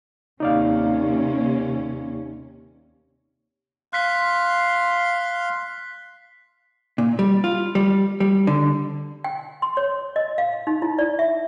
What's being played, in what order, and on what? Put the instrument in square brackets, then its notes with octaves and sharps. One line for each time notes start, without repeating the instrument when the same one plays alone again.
[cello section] D#2 C3 C#4 [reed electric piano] D#4 D5 F5
[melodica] F5 C6 [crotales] F#6 B6 C7
[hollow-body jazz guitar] A#2
G3
F4
G3
G3
D3
[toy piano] G5
C6
C#5
D#5
F5
D#4
E4
D5
E5